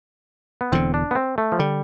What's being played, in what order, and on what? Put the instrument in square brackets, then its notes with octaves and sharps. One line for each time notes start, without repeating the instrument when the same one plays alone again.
[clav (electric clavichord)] B3
[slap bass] E1 E2 D3 [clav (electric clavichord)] C4
[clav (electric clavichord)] D4
B3
C4
A3
F3
[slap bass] D3 [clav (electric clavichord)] G3